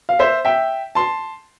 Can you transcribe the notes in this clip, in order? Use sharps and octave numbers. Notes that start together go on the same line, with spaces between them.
F5
C5 E5
E5 G5
A5 C6